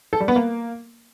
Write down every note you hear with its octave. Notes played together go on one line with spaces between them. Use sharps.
A4
G3
B3
A#3